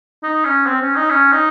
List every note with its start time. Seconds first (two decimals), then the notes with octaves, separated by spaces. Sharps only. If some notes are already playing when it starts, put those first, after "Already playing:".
0.23 D#4
0.45 C#4
0.67 C4
0.81 C#4
0.96 D#4
1.11 C#4
1.33 D#4